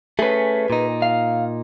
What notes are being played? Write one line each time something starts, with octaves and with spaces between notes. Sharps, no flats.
A3 C#4 G#4 B4
A#2 D#4
F5